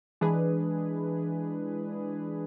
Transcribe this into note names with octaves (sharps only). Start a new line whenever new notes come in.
E3 G#3 D4 G#4 B4